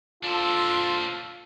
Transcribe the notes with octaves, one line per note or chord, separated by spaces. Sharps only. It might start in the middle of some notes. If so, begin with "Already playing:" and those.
D4 F4 A4 C5